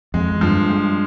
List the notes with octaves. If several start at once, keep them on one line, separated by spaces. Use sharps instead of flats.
F2 G#3
G2 F3
G#3